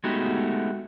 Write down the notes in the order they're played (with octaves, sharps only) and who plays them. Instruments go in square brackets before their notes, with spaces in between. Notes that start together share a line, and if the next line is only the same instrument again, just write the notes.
[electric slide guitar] G#3 A3 B3 D#4 F#4 G4